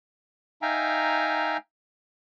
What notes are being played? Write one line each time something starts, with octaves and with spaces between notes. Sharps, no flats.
D#4 E5 F5 G5 G#5 A#5